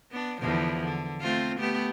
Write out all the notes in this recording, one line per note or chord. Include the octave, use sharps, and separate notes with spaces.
B3 D4
E2 D3 F3
D3
A3 C4 F4
A3 B3 G4